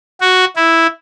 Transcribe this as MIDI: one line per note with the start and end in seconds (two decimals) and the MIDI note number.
0.21 0.45 66
0.56 0.87 64